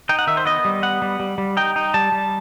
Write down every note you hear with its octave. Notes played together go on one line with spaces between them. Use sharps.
D#4 G5
F#5
D#3 E5
C5
B3 D#5
G3
B3 F#5
G3
G3
G3
D#4 G5
D#4
G3 A5
G3